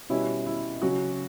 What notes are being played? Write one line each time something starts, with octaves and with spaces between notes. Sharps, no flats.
B2 G3 C#4 E4
E4
C#3 F#3 C#4 F#4